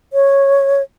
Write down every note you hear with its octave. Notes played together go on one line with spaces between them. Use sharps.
C#5